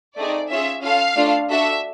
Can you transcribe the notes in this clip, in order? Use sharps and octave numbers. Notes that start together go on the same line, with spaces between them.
A3 C4 D#4 G#4 D5
C#4 F4 G#4 E5
C#4 F4 A4 F5
A3 D4 F4 A4
D4 F#4 A4 E5